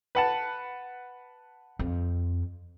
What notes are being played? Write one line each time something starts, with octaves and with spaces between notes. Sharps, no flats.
B4 F#5 A5
F2